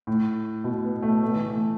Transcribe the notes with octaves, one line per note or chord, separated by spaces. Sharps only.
A2
B2
B3
A3
A3
E3
A3